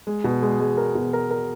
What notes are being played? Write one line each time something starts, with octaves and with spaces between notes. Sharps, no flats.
G#3
B2
G#3
G#3
A#4
B2
A#4
A#4